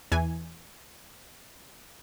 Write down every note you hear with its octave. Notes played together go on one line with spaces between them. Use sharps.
E2 E3 G#5